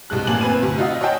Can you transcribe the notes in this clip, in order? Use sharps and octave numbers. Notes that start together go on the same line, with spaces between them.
C2 G2 G#3 F#6
A1 A#2 A#3 G#5 A5 F#7
G1 C4 B4 G#5 D#7
D2 C3
D#4 F4 F#4 D#5 E5 F#5
C#5 D#5 F#5 G5 A5